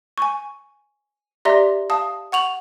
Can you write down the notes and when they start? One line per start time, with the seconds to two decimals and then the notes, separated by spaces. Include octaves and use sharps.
0.18 G#5 C#6
1.45 G4 D5 E5 A#5 C6 A#6
1.90 F5 A5 D#6
2.32 F#5 C#6 F7 F#7